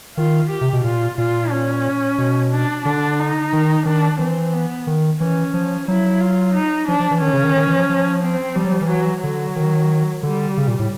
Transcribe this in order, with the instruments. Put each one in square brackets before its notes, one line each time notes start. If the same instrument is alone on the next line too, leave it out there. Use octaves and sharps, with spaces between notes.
[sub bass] D#3 [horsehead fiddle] F4
[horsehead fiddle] G4
[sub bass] C3
B2
[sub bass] A#2 [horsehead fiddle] F4
[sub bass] A#2 [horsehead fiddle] F4
[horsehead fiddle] C#4
[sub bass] B2
[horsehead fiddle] D4
[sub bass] D3 [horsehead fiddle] D4
[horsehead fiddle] D#4
[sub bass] D#3
[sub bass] D#3 [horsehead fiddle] D4
[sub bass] E3 [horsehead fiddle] C4
[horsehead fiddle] B3
[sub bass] D#3
[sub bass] E3 [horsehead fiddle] C#4
[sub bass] F3
[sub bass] F#3 [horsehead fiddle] E4
[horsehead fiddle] F4
D#4
[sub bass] F3 [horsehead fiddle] D4
[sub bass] F3
E3
[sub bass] D#3 [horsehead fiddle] C#4
[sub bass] C#3
D#3
D#3
E3
F3
F3
[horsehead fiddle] C4
[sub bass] F3 [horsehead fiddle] G3
[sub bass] F#3
F3
E3
[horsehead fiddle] F#3
[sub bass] D3 [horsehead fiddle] F#3
[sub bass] D#3
[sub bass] D3 [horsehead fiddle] G3
[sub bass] C#3
A#2
A2